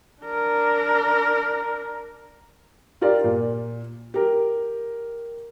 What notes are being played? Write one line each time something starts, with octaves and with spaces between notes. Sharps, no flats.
D4 A#4
F4 G4 A#4 D5
A#2
G4 A#4